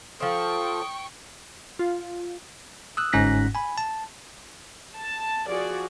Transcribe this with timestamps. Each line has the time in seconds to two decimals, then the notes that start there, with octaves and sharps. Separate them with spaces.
0.20 F3 C4 A4 G5 C#6 D#6
1.79 F4
2.97 D#6 E6 F#6
3.13 G1 G#2 C#4 F#6 A#6 B6
3.55 G#5 B5
3.78 A5
4.97 A5
5.48 F3 F#4 G#4 D5